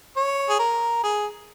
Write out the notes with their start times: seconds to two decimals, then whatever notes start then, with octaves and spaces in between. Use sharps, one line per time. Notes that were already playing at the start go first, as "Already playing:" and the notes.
0.16 C#5
0.50 G#4
0.59 A#4
1.04 G#4